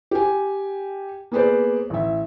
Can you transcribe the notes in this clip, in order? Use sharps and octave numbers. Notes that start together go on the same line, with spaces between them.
G4 G#5
A#3 B3 G#4 B4 C5 D5
A1 E5